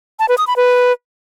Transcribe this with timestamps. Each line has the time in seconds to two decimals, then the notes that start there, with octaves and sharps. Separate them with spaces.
0.19 A5
0.29 B4
0.38 D#6
0.47 B5
0.57 B4